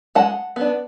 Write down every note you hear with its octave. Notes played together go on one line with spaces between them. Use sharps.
G#3 F#5 A5
B3 D4